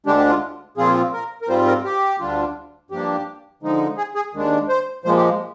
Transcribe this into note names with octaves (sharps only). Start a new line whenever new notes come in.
D2 D3 G#3 D4 G4
G4
F4
A#2 F3 C4 F4 G#4
A#4
A#4
G#2 G3 C4 F4 C5
A#4
G4
D2 D3 G3 D4 F4
G2 F3 A#3 D4 G4
D3 F3 G#3 D#4
G#4
G#4
D#2 D#3 G#3 D4
C5
A#2 F3 G#3 C5
G4